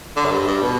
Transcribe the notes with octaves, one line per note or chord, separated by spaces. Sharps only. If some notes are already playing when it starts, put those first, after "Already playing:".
D3
F#2
G2
G2
B2